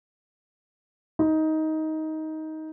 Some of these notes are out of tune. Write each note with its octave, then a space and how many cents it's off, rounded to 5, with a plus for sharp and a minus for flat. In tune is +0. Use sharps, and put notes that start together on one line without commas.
D#4 +15